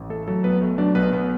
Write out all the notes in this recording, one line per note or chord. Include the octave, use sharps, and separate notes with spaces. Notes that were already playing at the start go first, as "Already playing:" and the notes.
Already playing: A1
A3 A4
F#3 A4
B1 B3 B4
A3
F#3 D4 D5
B1 B3 B4
B1 B3 B4